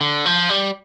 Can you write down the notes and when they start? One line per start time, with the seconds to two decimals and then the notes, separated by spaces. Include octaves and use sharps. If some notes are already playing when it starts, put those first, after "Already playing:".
0.01 D3
0.26 F3
0.49 G3